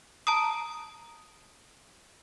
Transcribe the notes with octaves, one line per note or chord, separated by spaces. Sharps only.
A5 A#5 D#6